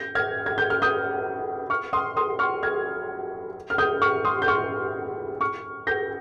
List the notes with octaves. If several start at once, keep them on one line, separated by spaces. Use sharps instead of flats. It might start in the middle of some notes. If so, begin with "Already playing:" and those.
Already playing: G6 A#6
F6 G#6
G#6
G6
F6
D#6 G6
C#6 F6
C6 D#6
C6 D#6
C#6 F6
F6 G#6
F6
D#6 G6
C#6 F6
C6 D#6
G6
C#6 F6
C#6 F6
G6 A#6